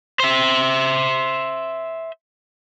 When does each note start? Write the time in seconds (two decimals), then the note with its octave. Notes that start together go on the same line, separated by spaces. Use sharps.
0.20 C5 E5